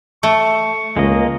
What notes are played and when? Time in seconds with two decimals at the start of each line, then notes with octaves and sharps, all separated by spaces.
0.23 A3 C#6
0.97 C#2 G#3 A#3 D#5